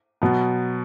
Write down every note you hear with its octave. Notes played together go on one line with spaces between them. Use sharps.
B2 F#3 B3